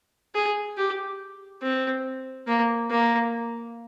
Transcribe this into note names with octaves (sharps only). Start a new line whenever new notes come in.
G#4
G4
C4
A#3
A#3